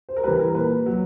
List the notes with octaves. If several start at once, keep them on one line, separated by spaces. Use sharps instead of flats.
C5
A#4
E3 G3 B4
A#4
A#2 B4
F#3